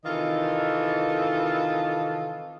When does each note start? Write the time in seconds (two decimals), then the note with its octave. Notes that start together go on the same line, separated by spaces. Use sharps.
0.05 C3 D#3 E3 F4 A4 D#5